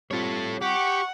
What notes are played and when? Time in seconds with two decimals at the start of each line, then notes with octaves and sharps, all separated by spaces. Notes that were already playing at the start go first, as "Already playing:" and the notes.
0.11 G3 C4 F4 A4 C#5
0.62 G4 F#5 C#6